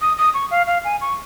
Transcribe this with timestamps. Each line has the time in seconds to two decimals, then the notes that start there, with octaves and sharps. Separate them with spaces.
0.01 D#6
0.18 D#6
0.34 C#6
0.51 F5
0.67 F5
0.85 G#5
1.01 C#6